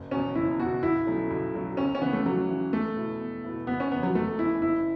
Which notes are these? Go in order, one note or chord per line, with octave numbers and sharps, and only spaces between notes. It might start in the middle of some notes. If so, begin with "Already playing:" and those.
Already playing: F#1
E2 B2 C#4
F#1 E4
E2 B2 F#4
B1 E4
B2 F#3 A3 C#4
B1
B2 F#3 A3 C#4
C#2 C#4
C#4
C#3 E3 B3
A3
C#2 F#3
C#3 E3
E2 A3
B2 B3 E4
E2
B2 B3 E4
F#1 B3
C#4
E2 E3 B3
F#3
F#1 A3
E2 E3 E4
F#1 E4